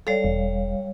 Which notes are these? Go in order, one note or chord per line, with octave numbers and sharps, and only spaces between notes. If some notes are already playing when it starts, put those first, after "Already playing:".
G3 A4 C#5 D5 F5
E1